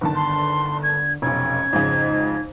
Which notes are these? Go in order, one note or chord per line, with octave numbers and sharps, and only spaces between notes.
G1 D3 D#3 A5
C6
G#6
F1 B1 C#4 G#6
F2 G#2 C#3 D#4